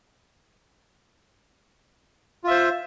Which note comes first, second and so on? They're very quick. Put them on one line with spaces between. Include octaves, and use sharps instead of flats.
F4 E5 C5